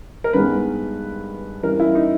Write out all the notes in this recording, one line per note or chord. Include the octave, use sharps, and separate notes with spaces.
A#4
G2 D#3 G#3 B3 B4
G2 E3 G3 C#4 A#4
E4
D#4